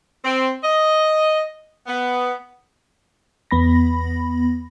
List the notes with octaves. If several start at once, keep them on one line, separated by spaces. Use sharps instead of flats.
C4
D#5
B3
E2 B3 B5 A#6